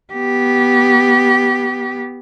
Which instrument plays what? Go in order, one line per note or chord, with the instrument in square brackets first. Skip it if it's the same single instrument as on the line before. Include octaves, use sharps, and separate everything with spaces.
[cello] B3 G4